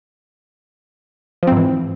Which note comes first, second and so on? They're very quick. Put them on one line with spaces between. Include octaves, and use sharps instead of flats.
F3 C4 G#2 E3